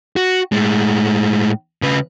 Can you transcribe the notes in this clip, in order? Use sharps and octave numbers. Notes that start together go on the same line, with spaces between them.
F#4
A2 G#3
C#3 B4